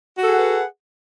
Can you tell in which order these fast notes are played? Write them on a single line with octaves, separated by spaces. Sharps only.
F#4 A4 G#4 F#5 B4